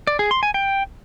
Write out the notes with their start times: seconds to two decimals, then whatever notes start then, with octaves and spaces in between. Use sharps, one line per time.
0.07 D5
0.19 G#4
0.31 C6
0.43 G#5
0.54 G5